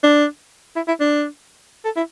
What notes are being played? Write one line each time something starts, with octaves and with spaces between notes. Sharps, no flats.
D4
E4
E4
D4
A4
E4